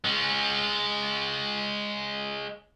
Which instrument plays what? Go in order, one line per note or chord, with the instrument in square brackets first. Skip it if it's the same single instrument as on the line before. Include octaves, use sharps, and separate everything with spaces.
[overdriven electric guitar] G#3 C#4